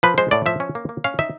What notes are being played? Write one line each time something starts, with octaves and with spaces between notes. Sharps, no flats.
F3 B4
G#3 C5
A2 D5
F3 E5
C#4
A#3
A#3
C#4 F5
D#4 E5